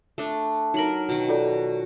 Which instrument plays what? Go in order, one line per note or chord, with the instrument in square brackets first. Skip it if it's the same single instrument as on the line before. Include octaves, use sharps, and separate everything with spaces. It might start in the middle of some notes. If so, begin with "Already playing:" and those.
[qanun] A3 D4
[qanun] F#3 A#4 [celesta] D#4 F#7
[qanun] B2 D#3
[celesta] F4 A4 D5